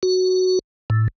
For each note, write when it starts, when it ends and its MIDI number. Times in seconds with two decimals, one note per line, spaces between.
0.03 0.59 66
0.90 1.08 45